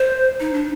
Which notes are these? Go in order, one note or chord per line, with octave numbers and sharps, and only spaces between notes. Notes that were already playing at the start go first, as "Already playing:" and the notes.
Already playing: C5
D#4
D4